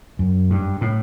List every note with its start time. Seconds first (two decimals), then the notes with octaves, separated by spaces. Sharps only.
0.19 F#2
0.50 G2
0.81 A2